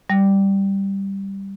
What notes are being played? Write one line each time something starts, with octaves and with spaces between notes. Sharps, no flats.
G3